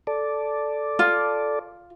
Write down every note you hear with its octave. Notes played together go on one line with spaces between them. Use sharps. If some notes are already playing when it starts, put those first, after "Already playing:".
A4 D5
F4